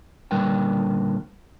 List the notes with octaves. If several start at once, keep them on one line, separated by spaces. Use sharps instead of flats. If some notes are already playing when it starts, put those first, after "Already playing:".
A#2 D3 G3 A#4 B4 G5